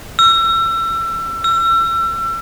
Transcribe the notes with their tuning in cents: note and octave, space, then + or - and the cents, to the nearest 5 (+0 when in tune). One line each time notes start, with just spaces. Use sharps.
E6 +30
E6 +35